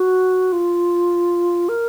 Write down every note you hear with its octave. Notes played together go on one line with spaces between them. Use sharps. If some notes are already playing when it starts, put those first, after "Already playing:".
Already playing: F#4
F4
A#4